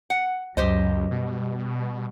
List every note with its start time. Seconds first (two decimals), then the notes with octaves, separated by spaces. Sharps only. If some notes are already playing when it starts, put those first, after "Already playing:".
0.10 F#5
0.57 C#2 F#2 F#3 G4 C5 D#5
1.11 B2 G3